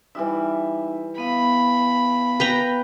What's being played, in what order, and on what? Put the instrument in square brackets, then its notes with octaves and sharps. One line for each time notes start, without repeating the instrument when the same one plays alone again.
[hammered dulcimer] E3 G3 E5 [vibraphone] D#4
[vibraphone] B3 F5 [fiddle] B5
[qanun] B4 G5 A#5